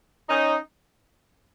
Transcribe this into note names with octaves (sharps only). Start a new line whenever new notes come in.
C#4 D#4